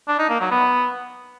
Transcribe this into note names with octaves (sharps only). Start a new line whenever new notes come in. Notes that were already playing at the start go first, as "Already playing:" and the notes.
D4
D#4
A#3
F#3
B3